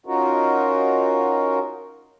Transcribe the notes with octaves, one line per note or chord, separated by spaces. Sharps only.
C#4 D#4 F4 F#4 A#4